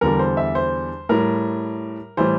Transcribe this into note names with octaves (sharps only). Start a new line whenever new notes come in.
E2 D3 G3 A#4
C5
E5
C5
A2 G3 A#4
A2 E3 G3 C5